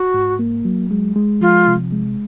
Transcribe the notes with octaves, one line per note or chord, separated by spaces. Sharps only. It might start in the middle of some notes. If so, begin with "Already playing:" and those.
Already playing: F#4
G#2
A#3
F#3
G#3
G#3
F3 F4
C3
G#3